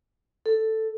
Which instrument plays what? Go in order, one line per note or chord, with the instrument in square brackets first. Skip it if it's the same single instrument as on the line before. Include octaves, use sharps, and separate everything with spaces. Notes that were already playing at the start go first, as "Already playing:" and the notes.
[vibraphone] A4